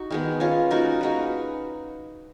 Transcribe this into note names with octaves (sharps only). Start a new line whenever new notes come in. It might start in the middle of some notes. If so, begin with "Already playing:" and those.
Already playing: D#4 F#4
D#3 G#3 B3
G#3 C#4 F4
A#3 D#4 F#4 A#4
G#3 D#4 F#4 B4